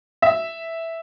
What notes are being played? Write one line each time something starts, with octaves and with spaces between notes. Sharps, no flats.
E5